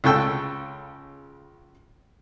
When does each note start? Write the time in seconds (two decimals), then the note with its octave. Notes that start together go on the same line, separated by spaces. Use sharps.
0.04 C#2 C#3 A4 G5 E6